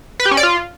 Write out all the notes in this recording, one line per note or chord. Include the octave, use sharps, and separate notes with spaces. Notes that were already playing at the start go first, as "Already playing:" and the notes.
B4
G4
C#4
D5
F4